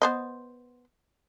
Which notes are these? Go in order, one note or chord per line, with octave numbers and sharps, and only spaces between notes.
B3 C5 D#5